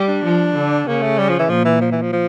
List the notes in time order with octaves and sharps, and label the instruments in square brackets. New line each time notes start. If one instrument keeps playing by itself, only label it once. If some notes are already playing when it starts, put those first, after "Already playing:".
Already playing: [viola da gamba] G3
[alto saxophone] D4
[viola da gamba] F3
D3
[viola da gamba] C#3 [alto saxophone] A#3
[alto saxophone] A3
G3
F3
E3
[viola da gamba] A#2 [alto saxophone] F3
[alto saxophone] E3
F3
E3
F3
F3